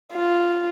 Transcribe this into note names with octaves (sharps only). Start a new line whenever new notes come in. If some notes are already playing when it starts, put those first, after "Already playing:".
F4